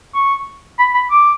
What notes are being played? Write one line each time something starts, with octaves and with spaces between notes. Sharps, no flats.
C#6
B5
B5
D6